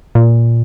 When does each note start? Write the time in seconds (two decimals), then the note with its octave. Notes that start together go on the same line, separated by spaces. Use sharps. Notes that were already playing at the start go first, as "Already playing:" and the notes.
0.15 A#2